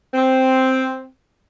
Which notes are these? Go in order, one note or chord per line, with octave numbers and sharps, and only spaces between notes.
C4